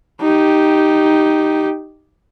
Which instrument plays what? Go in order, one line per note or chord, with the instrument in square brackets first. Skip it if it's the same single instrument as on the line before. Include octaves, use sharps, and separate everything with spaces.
[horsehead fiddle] D#4 G4